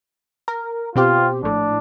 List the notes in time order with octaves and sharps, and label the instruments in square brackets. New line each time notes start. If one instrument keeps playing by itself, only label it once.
[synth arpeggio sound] A#4
[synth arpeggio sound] B2 C4 G4 [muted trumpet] F4
[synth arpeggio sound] A#1 A2 [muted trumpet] D4